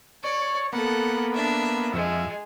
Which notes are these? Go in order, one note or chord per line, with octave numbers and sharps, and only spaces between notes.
C#5 D5
A#3 B3 A4 F#5
D4 E5
F2 G#3 E5